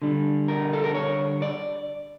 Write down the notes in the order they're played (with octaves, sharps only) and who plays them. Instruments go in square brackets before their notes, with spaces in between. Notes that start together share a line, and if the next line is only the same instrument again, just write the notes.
[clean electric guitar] D3 G3
A#4
A4
A#4
C#5
D5